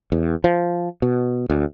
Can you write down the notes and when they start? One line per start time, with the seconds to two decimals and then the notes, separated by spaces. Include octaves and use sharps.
0.12 E2
0.44 F3
1.02 B2
1.50 D2